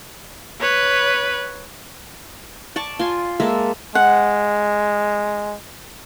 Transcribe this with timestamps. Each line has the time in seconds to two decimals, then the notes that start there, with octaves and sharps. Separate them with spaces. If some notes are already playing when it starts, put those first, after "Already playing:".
0.61 B4 C#5
2.76 D5 A5 C#6
2.99 F4 G#5 C6
3.40 G#3 A#3 A4 E5
3.95 G#3 F#5